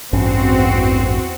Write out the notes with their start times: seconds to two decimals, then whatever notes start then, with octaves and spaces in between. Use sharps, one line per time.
0.13 A1 E2 G2 C4 C#4 F#4